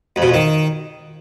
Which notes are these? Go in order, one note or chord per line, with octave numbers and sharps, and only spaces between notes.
F2
B2
F2
D#3